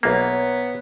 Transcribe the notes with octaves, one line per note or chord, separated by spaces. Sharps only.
B1 A#3 B3 C#5 E5 A#5